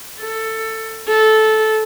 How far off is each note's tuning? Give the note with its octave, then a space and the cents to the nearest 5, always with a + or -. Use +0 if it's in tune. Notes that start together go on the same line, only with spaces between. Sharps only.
A4 +15
A4 -15